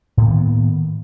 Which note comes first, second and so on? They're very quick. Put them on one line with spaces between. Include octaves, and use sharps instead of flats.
A2 A#3 D#3 B3